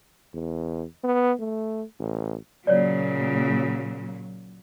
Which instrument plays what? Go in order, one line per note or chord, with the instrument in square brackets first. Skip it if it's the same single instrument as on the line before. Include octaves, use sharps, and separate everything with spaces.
[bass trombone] E2
B3
A3
A1
[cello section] A#2 F#3 [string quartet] C#3 [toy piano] C#5 D5